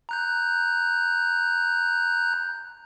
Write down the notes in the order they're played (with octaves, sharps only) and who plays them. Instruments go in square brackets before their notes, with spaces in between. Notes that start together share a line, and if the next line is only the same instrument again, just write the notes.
[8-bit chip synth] A#5 F#6 G6